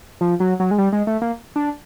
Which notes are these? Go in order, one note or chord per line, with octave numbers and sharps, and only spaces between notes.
F3
F#3
F#3
G#3
G3
G#3
A3
A#3
D4